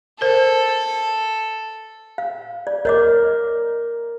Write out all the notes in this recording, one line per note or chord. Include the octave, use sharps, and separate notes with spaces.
A4 A#4 C5
F5
D5
A#4 C#5 D#5 D6